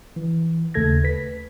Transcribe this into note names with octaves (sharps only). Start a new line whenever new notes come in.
E3
D#2 C#3 A3 A4 G#6 A#6
B4 B6